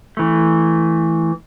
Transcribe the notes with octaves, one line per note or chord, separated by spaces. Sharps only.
E3 A3